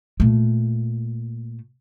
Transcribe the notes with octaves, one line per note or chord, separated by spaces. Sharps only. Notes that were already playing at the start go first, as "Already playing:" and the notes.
A#2 A3